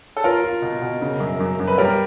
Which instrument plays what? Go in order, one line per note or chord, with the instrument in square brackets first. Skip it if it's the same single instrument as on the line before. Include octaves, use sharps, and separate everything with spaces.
[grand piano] A4
[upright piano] F4 [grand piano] A#4
[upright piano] F4
B2
B2
C#3
F#2
F#2
F#2
[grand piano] B4
[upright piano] G3 [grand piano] A#4